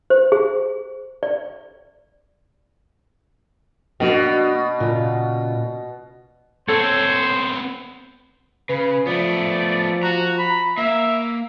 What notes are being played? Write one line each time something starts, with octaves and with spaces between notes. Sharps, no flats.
C5
G#4
D5
B2 A#3 D4 F#4
A#2 C#3 F4
B3 C4 A4 C5 C#5
C#3 B4
F3 A3 B3 D5
F#4 A#5
B5
A#3 E5